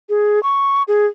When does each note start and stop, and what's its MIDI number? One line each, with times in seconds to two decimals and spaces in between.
0.09 0.42 68
0.43 0.83 85
0.88 1.06 68